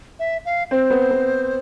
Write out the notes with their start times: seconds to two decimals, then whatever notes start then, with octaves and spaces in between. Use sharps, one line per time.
0.19 E5
0.45 F5
0.71 C4 C5
0.91 B3
1.11 B3